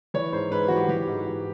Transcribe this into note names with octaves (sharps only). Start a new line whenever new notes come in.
E3 C#5
G#2 C5
G#2 B4
E3 F#4
G4
E3 G4
G#2
G#2